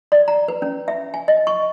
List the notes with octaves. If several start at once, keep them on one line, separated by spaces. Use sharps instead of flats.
D5
A#5
B4
C#4
E5
G#5
D#5
C#6